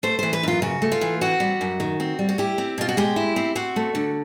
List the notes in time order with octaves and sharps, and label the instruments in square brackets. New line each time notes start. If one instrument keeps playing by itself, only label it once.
[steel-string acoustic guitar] A3 C5
E3 C5
B4
F#2 F4
C#3 F#4
A3
F4
E3
C4 F#4
G3
F#2
D#3
C4
G3
F#4
E4 G4
C4
B2 F4
F#4
G#3 G4
E4
C4
C4 F#4
A3
D3